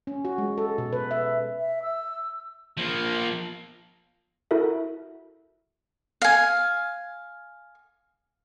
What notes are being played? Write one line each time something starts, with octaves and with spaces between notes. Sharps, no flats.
C#4
F#4
G#3
A4
B2
B4
E5
E5
E6
F3 A#3
E4 F#4 A4 A#4 E5
F5 G#5